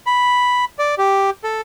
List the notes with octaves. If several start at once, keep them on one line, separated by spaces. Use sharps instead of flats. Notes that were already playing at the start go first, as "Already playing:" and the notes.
B5
D5
G4
A4